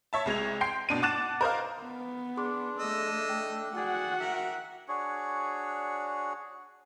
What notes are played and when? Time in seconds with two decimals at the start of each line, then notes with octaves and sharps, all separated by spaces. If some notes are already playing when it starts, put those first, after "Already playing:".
0.13 C#5 E5 A5
0.26 C2 G#3 G#6 F7
0.61 G5 C6 C7
0.89 B2 D4 D#7
1.02 F#5 A5 D6 F#6 A6 E7
1.41 A#4 C5 D#5 F5
1.82 B3
2.37 D4 G#4 C6 D6
2.79 A3 D#5 E6
3.29 G5
3.76 F#4 G#4 D5 F#5
4.20 A#4 E5
4.88 D4 F#4 G#4 C#5